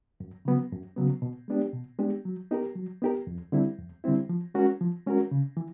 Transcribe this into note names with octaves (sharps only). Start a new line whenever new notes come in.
F#2
C#3 F#3 B3
F#2
C#3 F#3 B3
B2
G#3 B3 D4 G4
B2
G#3 B3 D4 G4
F#3
B3 D#4 G4 A#4
F#3
B3 D#4 G4 A#4
F2
D3 G3 C4 E4
F2
D3 G3 C4 E4
F3
G#3 C#4 F#4 A#4
F3
G#3 C#4 F#4 A#4
C#3
E3